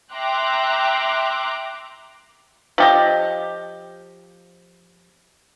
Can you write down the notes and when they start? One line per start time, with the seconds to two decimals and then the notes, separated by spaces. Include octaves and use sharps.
0.12 E5 G5 A#5 C6 D6 F#6
2.78 F3 G4 D#5